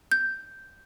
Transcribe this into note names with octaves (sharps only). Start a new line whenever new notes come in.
G6